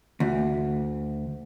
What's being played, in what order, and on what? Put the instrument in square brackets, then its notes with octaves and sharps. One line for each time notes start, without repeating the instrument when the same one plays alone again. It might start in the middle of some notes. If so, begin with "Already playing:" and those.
[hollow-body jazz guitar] D2